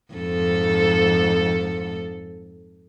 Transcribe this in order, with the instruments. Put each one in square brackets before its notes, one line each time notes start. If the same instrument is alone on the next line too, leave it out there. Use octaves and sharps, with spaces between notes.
[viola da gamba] F2 G#2 A4